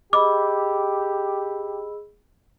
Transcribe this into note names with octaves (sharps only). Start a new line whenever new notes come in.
G4 G#4 D#5 B5 D6 E6